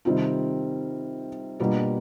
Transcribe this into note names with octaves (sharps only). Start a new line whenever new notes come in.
C3 D#3 G3 C4 F4
B2 G3 A#3 D4 F4